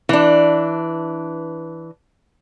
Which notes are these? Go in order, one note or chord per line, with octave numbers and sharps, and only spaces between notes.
E3 D4